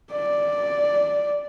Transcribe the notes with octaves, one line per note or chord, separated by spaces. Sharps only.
D5